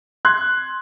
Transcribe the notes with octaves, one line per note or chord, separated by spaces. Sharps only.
C6 F#6 G#6